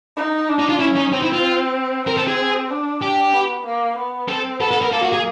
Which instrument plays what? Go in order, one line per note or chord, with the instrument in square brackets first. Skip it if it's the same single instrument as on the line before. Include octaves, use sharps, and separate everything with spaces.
[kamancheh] D#4
D4
[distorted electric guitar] D#4
F4
[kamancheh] C#4 [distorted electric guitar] E4
[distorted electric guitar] D#4
[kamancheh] C4 [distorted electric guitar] D#4
[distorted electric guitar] E4
F4
[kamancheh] C4 [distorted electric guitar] A#4
[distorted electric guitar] A4
G#4
[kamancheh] D4
[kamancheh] D4 [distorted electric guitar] G4
[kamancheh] B3
A#3
B3
[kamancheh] C4 [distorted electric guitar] A4
[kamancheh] B3 [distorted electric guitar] A4
[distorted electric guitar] A4
A#4
[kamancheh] A#3 [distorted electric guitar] A4
[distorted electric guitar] F#4
G#4